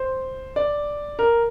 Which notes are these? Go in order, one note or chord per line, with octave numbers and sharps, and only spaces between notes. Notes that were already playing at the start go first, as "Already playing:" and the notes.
Already playing: C5
D5
A#4